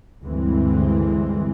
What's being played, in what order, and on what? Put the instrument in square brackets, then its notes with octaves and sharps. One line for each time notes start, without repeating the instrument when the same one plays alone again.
[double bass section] D2 G2 D3 E3 G#3 C4